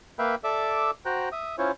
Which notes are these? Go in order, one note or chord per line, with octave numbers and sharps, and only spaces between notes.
A#3 B4 E5 F5 G5 B5
A4 D5 E5 D6 E6
F#4 C5 G5 A#5 F#6
E5 D#6
C#4 E4 F4 C5 C#5